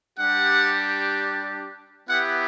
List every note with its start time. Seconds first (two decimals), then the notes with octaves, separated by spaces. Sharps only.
0.19 G3 D4 G4 F#5
2.08 B3 E4 G4 F#5